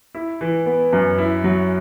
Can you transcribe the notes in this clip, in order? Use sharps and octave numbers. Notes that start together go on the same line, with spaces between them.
E4
E3
B3
F#2
E4
F#3